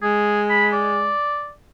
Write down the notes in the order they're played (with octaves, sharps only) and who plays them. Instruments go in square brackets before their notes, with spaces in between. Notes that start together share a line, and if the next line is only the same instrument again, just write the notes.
[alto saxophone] G#3 [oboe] G#4
[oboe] B5
D5